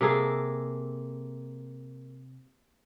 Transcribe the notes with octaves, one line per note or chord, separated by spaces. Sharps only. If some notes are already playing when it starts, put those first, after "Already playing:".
C3 A#3 G#4 A4